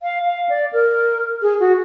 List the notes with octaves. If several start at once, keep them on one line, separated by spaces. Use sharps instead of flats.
F5
F5
D5
A#4
G#4
F#4